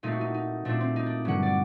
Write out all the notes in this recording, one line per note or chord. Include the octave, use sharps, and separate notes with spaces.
A#2 A3 C4 D#4
F#4
D#4
D#4
A#2 A3 C4 D4
C4
D#4
D4
G2 D3 F#3 F#5
D5